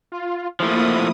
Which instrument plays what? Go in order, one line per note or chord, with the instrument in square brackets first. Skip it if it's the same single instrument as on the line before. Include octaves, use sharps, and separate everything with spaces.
[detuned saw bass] F4
[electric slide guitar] F3 A3 [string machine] A#3 D#6 [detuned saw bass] E4